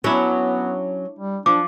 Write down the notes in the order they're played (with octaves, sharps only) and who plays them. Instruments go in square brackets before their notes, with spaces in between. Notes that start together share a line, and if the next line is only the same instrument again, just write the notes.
[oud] F#3 C#4 [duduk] B3 [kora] D4 E4 C#5
[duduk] G3
[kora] F3 [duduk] D4 [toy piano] D6